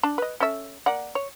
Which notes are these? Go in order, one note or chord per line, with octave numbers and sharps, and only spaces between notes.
D4 A5
B4 D#5
C#4 A4 E5
A#3 D5 F#5
C#5